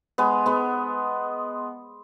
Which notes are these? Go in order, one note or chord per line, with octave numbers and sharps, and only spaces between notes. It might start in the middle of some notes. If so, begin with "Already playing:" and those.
G#3 B3
G#3 B3